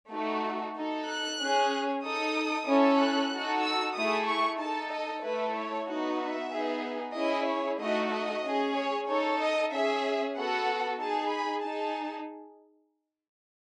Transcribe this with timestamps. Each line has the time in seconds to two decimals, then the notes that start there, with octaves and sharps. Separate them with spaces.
0.11 A3 D#4 F#4 A4
0.75 D#4 A4
1.07 F#6
1.39 C#4 G#4
2.03 D#4 A4 D#6
2.67 C#4 E4 A4
2.99 F#6
3.31 D#4 F#4 A4
3.63 E6
3.95 A3 E4 G#4 D#6
4.27 C#6
4.59 D#4 A4 A5
4.91 D#5
5.23 A3 E4 A4 B4
5.55 C#5
5.87 B3 D#4 F#4
6.20 E5
6.51 B3 D#4 G#4
7.15 C#4 E4 G#4 D#5
7.47 C#5
7.79 A3 D#4 F#4 D#5
8.11 D#5
8.44 C#4 G#4
8.75 C#5
9.08 D#4 A4 C#5
9.39 D#5
9.72 C#4 G#4 E5
10.36 B3 F#4 A4 F#5
11.00 D#4 G#4 A5
11.32 B5
11.64 D#4 G#4 A5